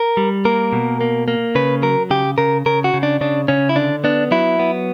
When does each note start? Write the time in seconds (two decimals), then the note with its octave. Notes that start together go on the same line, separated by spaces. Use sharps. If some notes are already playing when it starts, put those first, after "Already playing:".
Already playing: A#4
0.17 G3
0.45 A#3 A#4
0.73 B2
1.01 A#3
1.28 A#3
1.55 C#3 B4
1.83 F#3 A#4
2.11 C#3 G4
2.38 C#3 A#4
2.66 C#3 A#4
2.84 F#4
2.94 C#3
3.03 D4
3.21 C#3 D4
3.48 C#3 C#4
3.69 E4
3.76 D3 D4
4.04 B3 D4
4.31 F#3 E4
4.59 B3